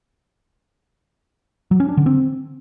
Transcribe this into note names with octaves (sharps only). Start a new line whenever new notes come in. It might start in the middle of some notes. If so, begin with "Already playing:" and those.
F#3
C#4
D4
D3
C4